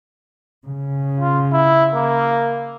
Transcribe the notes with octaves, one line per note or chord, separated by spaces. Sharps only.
C#3
F4
E4
A#3